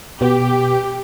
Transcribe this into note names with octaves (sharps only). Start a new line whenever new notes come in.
B2 B3 G4